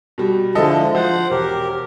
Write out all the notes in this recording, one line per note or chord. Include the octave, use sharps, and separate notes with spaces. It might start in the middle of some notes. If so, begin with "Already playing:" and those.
B2 G3
D3 F3 G#3 E4 A4 D#5
F3 C5 F#5
E1 G4 A#4